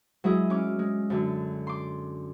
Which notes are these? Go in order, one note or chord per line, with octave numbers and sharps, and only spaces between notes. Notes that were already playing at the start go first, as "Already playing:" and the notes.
F#3 G#3 E4 G#4
C#4 D6 F6
G#3
F#2 D3
C6 D6